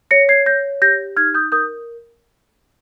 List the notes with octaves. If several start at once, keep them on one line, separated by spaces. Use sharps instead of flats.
C#5 A#6 C#7
G#6 C7
C#5 G6 A#6
G4 G6 A#6
D#4 F6 G#6
D#6 G6
A#4 D#6 G6